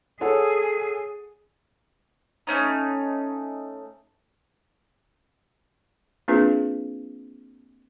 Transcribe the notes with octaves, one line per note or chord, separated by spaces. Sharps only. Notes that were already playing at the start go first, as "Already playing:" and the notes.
G#4 A4 C#5 F#5
A3 C#4 D#4
A#3 C4 D4 F4 G#4 B4